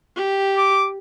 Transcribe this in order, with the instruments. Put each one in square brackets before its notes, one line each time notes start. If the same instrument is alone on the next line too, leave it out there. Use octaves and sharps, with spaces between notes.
[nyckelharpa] G4
[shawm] D6